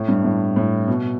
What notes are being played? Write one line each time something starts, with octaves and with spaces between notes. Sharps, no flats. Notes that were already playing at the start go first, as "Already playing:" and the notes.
Already playing: A2
G2
A2
A2
B2